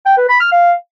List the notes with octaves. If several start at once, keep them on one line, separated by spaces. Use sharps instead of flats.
G5
B4
B5
F6
F5